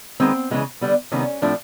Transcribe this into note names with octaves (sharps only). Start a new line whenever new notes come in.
D#3 G#3 B3 C4
C#3 E3 G#3 B3
D3 G3 B3
C3 D#3 G3 B3 C#4
A2 F3 A3 C4 D4